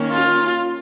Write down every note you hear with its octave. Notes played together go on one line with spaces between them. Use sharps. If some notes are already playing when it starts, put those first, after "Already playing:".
Already playing: D#3 A#3 C#4
F4